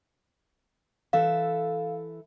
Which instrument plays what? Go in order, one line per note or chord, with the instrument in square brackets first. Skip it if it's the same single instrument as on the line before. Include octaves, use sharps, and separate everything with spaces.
[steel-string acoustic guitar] E3 A4 E5 [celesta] F5